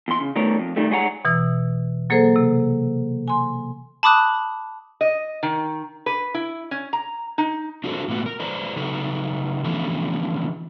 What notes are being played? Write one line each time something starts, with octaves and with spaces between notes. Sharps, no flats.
E2 C6
C#3
D#3 G3 A3 B3 A#4 C#5
F2
D#3 G3 A3
G#2 G3 G#4 C#5 F#5 A#5
B2 E3 E6
F#3 A#3 G#4 A4 C5
C3
G#5 C6
A5 B5 D6 D#6 F#6
D#5
D#3
B4
E4
C#4
A#5
D#4
D4 F4 F#4 A4 A#4 C5
A2 A#3 B3 B4
A#4
B4 C5 D5 A#5
C#3 F#3 D#4 A4 B4
D3 E3 F3 A3 B3 C#4